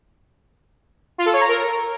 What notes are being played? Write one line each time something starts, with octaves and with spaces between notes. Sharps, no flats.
F4
A4
C#5
A#5
A#4